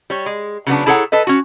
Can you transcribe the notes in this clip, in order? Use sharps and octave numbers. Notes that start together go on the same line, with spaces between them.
G3 C#5
G#3
C#3 F#3 B3 D4
E4 G#4 A4 C#5 F#5 A#5
A4 B4 D#5
C#4 F#4